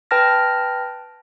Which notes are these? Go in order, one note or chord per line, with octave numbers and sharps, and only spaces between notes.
B4 G5 A5 F6 A#6